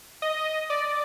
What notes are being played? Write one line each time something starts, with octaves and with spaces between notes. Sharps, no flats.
D#5
D5